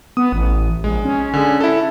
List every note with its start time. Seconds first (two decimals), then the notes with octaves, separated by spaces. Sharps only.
0.17 B3 D#6
0.32 A1
0.84 A#1 G#3
1.05 C#4
1.33 D3 G#4
1.61 E4 A4